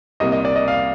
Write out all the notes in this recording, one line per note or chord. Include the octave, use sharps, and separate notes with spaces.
C2 C3 G3 A#3 D#5
D#5
D5
D#5
F5